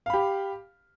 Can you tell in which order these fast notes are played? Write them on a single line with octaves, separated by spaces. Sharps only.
F5 B5 G4